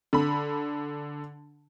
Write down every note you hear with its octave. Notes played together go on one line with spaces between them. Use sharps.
D3 B5